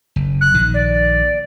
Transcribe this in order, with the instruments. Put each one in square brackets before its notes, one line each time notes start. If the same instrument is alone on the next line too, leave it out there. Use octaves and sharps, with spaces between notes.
[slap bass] F#1
[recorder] F#6
[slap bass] A#1 D#3
[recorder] D5